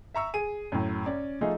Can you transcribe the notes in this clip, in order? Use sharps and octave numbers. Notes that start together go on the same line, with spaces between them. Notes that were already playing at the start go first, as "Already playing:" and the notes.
E5 A#5 C#6 E6
G#4 D#7
F#2 A2
C#4 D5
F3 A3 D#4 F4 G#4 D#5